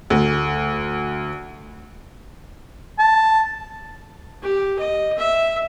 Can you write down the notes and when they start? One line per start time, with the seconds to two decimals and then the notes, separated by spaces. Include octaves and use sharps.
0.10 D2
2.99 A5
4.43 G4
4.79 D#5
5.18 E5